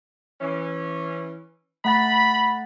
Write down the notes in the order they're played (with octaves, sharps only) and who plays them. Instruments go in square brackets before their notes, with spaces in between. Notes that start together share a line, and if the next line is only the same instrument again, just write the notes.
[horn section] E3 C#4
[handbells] A3 F#5 A6 [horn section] B5